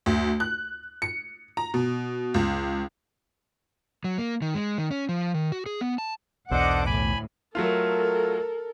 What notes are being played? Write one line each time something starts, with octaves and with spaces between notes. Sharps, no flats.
D2
F#6
C#7
A#5
B2
C#2
F#3
A#3
D#3
G#3
D#3
C#4
F3
D#3
F#4
G#4
B3
A5
B1 E2 D4 A4 C5 D#5 F#5 D6
D2 A2 G#5 B5
F#3 A3 F4 A4 A#4